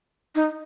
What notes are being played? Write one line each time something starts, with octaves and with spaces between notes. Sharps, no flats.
D#4